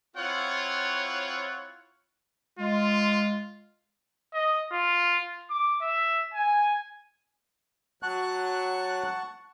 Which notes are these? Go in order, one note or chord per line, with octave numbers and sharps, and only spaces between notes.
C4 E4 F4 C#5 F#5
G#3 F4
D#5
F4
D6
E5
G#5
F#3 F#5 A5 C#6 F#6